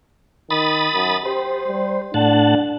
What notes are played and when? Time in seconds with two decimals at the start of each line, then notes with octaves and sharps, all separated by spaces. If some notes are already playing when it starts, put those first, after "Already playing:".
0.50 D#3 B5 D#6 A6
0.94 F#2
1.25 G4 C5
1.67 G3
2.14 A2 D4 F#5 A5